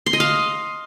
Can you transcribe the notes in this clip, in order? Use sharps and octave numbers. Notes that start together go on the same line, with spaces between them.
C6
D#5
F5